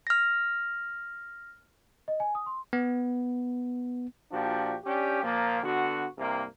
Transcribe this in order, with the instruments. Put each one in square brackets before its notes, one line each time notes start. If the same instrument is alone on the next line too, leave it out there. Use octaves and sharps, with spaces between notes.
[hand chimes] F6 A#6
[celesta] D#5
G#5
D#6
C6
[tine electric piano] B3
[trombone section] A#2 F3 D4 F#4 G4
C#4 D4 G4
A#2 F3 A#3
D3 B3 F#4
C2 G2 C3 A#3